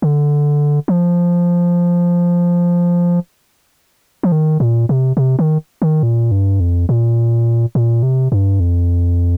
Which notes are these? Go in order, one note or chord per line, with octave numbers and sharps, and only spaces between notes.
D3
F3
F3
D#3
A#2
C3
C3
D#3
D#3
A#2
G2
F2
A#2
A#2
C3
G2
F2